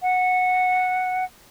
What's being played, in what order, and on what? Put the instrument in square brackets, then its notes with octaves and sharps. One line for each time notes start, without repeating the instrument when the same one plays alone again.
[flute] F#5